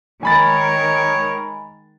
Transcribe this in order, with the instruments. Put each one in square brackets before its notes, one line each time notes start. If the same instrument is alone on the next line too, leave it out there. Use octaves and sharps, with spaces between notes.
[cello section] D#3 G#3 A#4 [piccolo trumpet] C#5 [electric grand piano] G#5 B5 A6